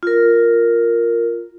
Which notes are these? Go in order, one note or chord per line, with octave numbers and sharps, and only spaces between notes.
F4 A#4